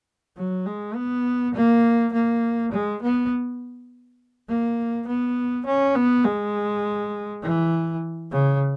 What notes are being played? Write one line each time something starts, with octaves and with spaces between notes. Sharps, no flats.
F#3
G#3
B3
A#3
A#3
G#3
B3
A#3
B3
C#4
B3
G#3
E3
C#3